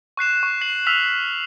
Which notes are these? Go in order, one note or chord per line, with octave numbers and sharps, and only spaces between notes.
C#6 F#6 C7 E7
C#6
C7 F#7
E6 F6 B6 F7